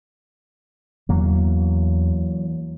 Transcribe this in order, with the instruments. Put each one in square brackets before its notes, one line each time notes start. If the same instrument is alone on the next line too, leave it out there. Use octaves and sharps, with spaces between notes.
[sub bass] E2 [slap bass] E3 F#3 A#3